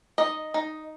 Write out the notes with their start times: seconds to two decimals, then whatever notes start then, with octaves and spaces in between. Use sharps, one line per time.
0.18 D#4 D#5
0.54 D#4